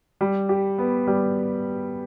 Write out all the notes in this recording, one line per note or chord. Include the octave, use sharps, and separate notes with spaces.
G3
G4
B3
G3